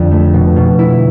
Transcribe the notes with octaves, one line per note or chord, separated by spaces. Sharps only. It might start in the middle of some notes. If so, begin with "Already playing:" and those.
Already playing: F2 D3
A3
B2
B2
E4